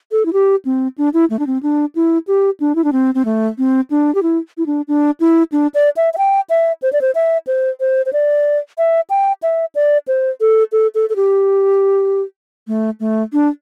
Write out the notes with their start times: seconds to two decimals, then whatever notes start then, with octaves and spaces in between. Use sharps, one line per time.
0.12 A4
0.26 E4
0.33 G4
0.65 C4
0.98 D4
1.14 E4
1.30 A3
1.39 D4
1.47 C4
1.63 D4
1.95 E4
2.27 G4
2.60 D4
2.75 E4
2.84 D4
2.92 C4
3.15 C4
3.25 A3
3.58 C4
3.90 D4
4.15 G4
4.23 E4
4.58 E4
4.66 D4
4.88 D4
5.20 E4
5.52 D4
5.74 D5
5.97 E5
6.14 E5
6.18 G5
6.50 E5
6.82 C5
6.93 D5
7.01 C5
7.15 E5
7.47 C5
7.80 C5
8.06 C5
8.13 D5
8.78 E5
9.10 G5
9.43 E5
9.75 D5
10.08 C5
10.41 A4
10.72 A4
10.95 A4
11.10 A4
11.16 G4
12.68 A3
13.00 A3
13.33 D4